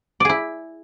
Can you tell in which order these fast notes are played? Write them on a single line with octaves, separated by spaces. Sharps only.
D5 G#4 E4